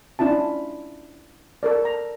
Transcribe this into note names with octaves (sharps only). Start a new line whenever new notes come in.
C#4 D4 E4 F4 A5
A4 A#4 D5
A#5